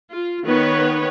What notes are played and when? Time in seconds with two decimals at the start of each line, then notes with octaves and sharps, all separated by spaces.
0.11 F4
0.44 D#3 B3 B4 C#5